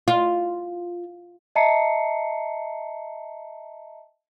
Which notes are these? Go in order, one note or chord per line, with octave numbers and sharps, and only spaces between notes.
F4
D#5 E5 A5 A#5 C7 C#7